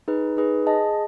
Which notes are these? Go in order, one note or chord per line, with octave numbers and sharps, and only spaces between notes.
D#4 G#4 B4
D#4 G#4 B4
G#4 D#5 A5